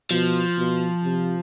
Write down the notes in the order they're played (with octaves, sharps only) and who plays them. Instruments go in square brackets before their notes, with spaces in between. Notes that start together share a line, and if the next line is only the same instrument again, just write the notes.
[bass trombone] B2 [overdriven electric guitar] F3
[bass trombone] B2
C3